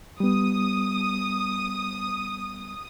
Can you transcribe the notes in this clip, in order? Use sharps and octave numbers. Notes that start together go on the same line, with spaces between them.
G3 B3 D#6